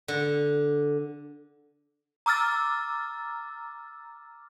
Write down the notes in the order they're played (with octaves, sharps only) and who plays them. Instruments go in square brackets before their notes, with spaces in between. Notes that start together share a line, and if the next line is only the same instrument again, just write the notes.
[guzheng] D3
[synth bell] A#5 D6 E6 F6 A6